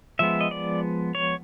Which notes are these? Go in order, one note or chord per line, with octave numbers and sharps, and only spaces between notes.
F3 G#3 B3 E5
D#5
D5
C#5